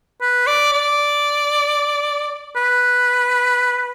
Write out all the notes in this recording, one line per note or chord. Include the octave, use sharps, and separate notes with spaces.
B4
D5
D5
B4